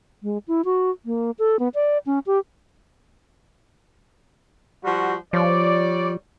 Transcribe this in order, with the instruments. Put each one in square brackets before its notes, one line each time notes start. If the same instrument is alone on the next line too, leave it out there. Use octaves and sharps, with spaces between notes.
[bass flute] G#3
E4
F#4
A#3
A4
B3
D5
C#4
G4
[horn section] F3 G3 F#4
[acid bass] F3 [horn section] G3 C#5 D5